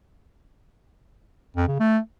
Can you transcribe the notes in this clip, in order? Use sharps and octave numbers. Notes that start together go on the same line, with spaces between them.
F2
C#3
A3